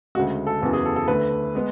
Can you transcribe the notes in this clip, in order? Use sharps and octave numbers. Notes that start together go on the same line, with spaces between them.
D2 C#3 G#3 F#4
A4
F#1 E2 C#3 F#3 B3 A4
G#4
A4
A4
D2 D3 A3 B4
G#3 B3